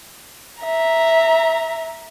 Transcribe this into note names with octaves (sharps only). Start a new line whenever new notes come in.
E5 A#5